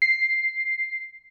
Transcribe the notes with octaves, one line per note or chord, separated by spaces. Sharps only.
C7